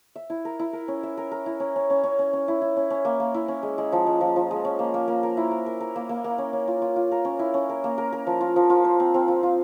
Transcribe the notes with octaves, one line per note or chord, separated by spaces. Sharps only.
E5
E4
A#4
E4
A#4
C#4
E5
A#4
A#4
E4
C#4
C#4
C#4
C#4
C#4
C#4
E4
E4
C#4
C#4
A#3
A#3
E4
C#4
G#3
G#3
F3
G#3
F3
F3
G#3
C#4
A#3
A#3
A#3
A#4
E4
A#4
A#4
A#4
A#3
A#3
A#3
C#4
C#4
F4
F4
F4
A#4
C#4
E4
C#4
A#4
A#3
A#4
A#4
F3
F4
F3
F4
C5
C4
C4
F4
F4